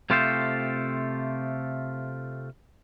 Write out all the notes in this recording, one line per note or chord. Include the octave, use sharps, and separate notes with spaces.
C3 A3 F4 G4 A4 C5